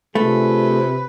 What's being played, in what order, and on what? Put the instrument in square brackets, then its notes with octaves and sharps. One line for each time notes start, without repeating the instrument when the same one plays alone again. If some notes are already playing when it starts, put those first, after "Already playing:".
[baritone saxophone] C3 [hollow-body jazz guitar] A3 [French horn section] D4 F4 G#4 [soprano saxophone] B4